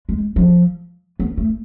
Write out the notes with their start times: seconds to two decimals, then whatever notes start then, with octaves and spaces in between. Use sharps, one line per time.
0.09 G#3
0.36 F3
1.20 B3
1.37 A3